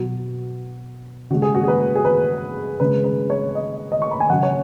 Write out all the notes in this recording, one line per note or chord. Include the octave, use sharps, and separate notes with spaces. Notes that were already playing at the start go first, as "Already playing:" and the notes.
Already playing: B2 F#3 F#4
C#3 G#3 F#4
G#4
F#4
G#4
B4
G#4
B4
C#3 G#3 B4
B4
C#5
D#5
D#5
C#6
B5
G#5
C#3 F#3 F#5
C#5